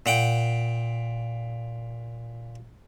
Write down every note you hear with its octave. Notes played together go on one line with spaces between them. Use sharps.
A#2 F#5 G5